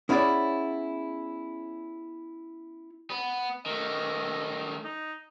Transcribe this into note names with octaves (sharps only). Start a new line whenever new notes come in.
B3 C#4 E4 G#4 C#5 D5
B3
D#3 A3 D#5
D#4